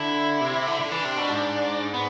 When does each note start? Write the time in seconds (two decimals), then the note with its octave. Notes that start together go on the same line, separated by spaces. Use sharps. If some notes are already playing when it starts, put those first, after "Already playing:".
Already playing: D3 E4
0.41 C3
0.67 D3
0.80 D3
0.92 E3 D4
1.04 C3
1.17 B2
1.30 G#2
1.94 B3